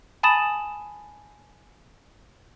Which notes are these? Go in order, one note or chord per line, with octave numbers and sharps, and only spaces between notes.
G#5 A5 B5 D#6 A6 E7